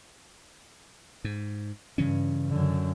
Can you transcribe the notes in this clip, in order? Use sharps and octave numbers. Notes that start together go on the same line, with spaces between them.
G#2
G2 C#3 E3 C#4
F#2 D3